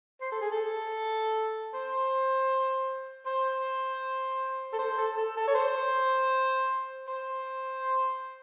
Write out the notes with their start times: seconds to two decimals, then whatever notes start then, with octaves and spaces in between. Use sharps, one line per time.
0.21 C5
0.32 A4
0.41 G#4
0.52 A4
1.74 C5
3.26 C5
4.73 A4
4.79 C5
4.98 A4
5.17 A4
5.37 A4
5.48 C#5
5.55 C5
7.08 C5